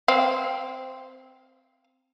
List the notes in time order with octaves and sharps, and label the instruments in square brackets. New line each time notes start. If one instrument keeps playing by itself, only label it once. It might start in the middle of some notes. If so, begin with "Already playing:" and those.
[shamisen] C4 F5